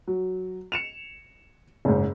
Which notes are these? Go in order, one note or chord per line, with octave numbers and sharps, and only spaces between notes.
F#3
C#7 E7 F7
F#1 G#2